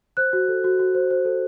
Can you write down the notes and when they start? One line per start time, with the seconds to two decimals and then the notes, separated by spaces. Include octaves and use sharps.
0.17 C5 F#6
0.33 F#4
0.48 A4
0.64 F#4
0.79 F#4
0.95 C5
1.11 C5
1.25 A4